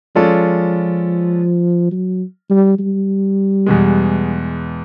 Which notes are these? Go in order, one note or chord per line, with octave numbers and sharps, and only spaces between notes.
F3 G#3 C#4 F4 A4 D5
F#3
G3
G3
E2 B2 G#3